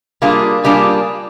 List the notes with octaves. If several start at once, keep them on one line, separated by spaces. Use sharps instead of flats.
G3 A#3 D4 F4 G#4
G3 A#3 D4 F4 G#4